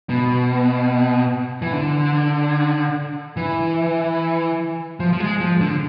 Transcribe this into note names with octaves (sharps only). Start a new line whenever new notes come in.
B2
E3
D3
E3
F3
F3
G#3
F3
D3